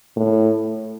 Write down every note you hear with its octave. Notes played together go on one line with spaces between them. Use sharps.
A2